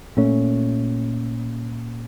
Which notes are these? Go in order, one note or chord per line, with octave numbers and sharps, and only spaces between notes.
A#2 A3 C#4